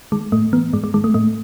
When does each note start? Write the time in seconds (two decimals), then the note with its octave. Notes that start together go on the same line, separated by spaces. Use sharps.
0.12 D#3 G#3
0.32 A2 A3
0.53 E3 B3
0.73 G#2 G#3
0.84 G#3
0.94 D#3 G#3
1.04 A3
1.14 A2 A3